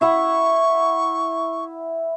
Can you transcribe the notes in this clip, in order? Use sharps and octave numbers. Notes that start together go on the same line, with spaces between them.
E4 E5 F#5 C#6